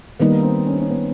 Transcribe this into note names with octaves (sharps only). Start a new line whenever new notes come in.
D#3 G3 A#3 B3 D#4
C4
C#4
C4
C#4
B3